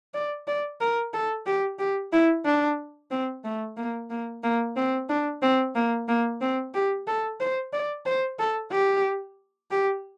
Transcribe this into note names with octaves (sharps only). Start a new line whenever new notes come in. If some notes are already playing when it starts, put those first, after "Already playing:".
D5
D5
A#4
A4
G4
G4
E4
D4
C4
A3
A#3
A#3
A#3
C4
D4
C4
A#3
A#3
C4
G4
A4
C5
D5
C5
A4
G4
G4